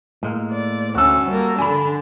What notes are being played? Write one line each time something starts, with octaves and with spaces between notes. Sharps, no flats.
A2 G#3 A#3
D5
D2 C#4 F#4 A4
G3 A#3
D3 D4 G#5 B5